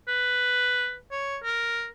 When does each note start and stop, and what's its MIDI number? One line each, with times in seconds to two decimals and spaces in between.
0.08 0.96 71
1.12 1.37 73
1.43 1.87 70